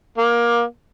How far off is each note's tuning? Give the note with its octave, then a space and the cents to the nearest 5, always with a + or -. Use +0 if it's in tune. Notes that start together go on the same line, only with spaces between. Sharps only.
A#3 +20